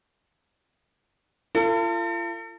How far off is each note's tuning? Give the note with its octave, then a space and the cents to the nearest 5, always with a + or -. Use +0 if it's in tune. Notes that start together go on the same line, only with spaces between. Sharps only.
F4 -40 A4 +40